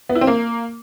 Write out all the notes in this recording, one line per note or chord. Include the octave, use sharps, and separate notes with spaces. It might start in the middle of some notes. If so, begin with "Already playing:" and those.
B3
E4
C4
A#3